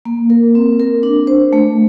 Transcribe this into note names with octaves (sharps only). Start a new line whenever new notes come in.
A#3
A#4
C4
A#4
D4
C5
A3